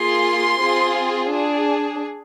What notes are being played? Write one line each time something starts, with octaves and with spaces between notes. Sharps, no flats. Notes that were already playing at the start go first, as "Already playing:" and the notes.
Already playing: A#3 F4 G#4 C6
C4 F4 G#4
D4 G#4